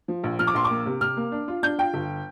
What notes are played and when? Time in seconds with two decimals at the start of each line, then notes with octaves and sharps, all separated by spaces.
0.08 F3
0.24 A#1
0.39 F3 F6
0.47 D6
0.54 A#1 C6
0.65 D6
0.70 A#3
0.86 C3
1.01 C3 F6
1.17 A#3
1.32 D4
1.48 F4
1.63 D4 G6
1.78 F4 G5
1.94 G1